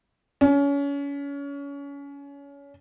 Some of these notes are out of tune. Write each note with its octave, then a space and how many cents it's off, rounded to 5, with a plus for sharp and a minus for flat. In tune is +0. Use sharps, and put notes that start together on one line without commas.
C#4 +30